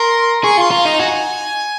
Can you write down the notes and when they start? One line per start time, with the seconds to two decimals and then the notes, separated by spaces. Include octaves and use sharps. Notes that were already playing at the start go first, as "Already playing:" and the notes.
Already playing: A#4 C6
0.44 G#4 C#6
0.57 F4 C6
0.71 F4 A#5
0.85 D#4
0.99 F#4 G#5